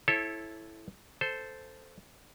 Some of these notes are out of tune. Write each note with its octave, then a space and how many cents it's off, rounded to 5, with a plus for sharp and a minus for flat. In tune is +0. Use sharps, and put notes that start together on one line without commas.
E4 +0 A4 -10 C#5 -35
A4 +0 C5 -10